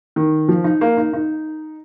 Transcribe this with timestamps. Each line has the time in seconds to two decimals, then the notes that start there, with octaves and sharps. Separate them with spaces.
0.16 D#3
0.48 F3
0.64 D#4
0.81 A#3
0.97 D#4
1.13 D#4